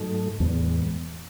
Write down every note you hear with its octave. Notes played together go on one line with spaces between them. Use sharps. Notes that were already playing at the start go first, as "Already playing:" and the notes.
Already playing: G#2 F#3 A3 D#4 A4
E2 A2 G#3 B3